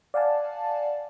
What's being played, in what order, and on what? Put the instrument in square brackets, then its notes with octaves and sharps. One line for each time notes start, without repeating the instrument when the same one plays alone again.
[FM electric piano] D5 F5 F#5 G#5 A5